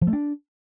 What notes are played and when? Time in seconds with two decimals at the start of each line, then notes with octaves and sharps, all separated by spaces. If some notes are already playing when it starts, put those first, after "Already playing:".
0.01 F3
0.07 A3
0.13 D4